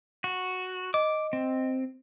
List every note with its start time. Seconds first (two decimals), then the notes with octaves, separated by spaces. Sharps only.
0.24 F#4
0.94 D#5 D6
1.33 C4